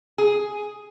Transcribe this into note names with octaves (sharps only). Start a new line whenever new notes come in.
G#4